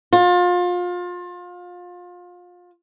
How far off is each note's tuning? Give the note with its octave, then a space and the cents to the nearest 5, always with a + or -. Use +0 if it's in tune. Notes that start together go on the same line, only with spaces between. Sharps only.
F4 +30